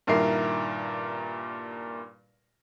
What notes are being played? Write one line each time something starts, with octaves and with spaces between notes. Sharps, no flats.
G2 A#2 D#3 E4 A#4 C7